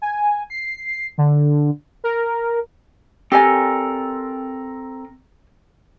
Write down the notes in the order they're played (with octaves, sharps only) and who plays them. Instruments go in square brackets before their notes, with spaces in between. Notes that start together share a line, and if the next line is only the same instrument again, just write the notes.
[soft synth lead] G#5
C7
D3
A#4
[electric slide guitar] C4 A4 A#4 [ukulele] G4 D5 G#5